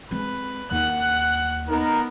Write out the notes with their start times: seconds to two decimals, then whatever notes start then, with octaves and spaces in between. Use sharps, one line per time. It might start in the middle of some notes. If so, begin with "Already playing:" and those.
0.11 G#3 C4 B4
0.71 D#2 F#5 F#6
1.69 B3 D#4 A#4